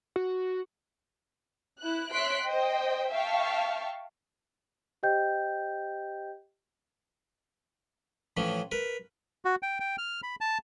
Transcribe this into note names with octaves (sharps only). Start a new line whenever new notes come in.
F#4
E4 F#6
C#5 E5 C6 F#6 B6 D7
C5 D#5 G5
E5 F5 G5 A5 C#6
G4 C5 D#5 G5 G6
A2 E3 F3 C#4
A#4 B4
F#4
G5
G5
F6
B5
A5